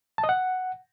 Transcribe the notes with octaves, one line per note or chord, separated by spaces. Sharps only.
A5
D#5
F#5